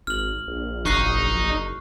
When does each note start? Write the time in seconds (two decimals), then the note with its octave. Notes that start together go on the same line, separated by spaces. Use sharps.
0.07 G#1 F6 F#7
0.48 A#1
0.86 F#1 D#4 C#6 F#6 C7